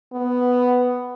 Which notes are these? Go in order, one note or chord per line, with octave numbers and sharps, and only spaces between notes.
B3